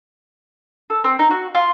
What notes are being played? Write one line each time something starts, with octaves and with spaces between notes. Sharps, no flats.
A4
C4
D#4
F#4
F4